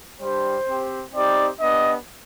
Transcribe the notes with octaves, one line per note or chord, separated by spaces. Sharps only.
G3 D4 G4 C5
C4 G4
C4 D#4 G4 D5
B3 D4 G4 D#5